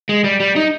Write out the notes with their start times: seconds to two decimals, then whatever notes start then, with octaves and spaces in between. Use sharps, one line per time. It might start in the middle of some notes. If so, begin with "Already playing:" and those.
0.09 G#3
0.24 G3
0.40 G3
0.56 D#4